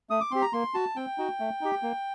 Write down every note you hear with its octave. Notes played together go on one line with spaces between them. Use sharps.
A3 D#6
D6
C4 G4 C6
A#5
A#3 C6
F#4 A5
C4 G5
D#4 F#4
A3
D#4 G4
A#3